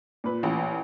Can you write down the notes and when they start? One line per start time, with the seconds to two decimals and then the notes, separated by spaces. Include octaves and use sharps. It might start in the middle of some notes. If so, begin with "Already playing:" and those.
0.24 A#2 B4
0.43 A1